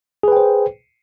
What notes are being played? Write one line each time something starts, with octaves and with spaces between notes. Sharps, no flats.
G#4 B4 C5 G5